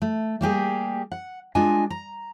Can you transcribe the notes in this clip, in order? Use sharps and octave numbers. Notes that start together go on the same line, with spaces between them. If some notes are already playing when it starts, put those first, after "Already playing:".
A3
G3 A#3 G4 G#4
F#5
G#3 D4 F4 D#5 G#5
A#5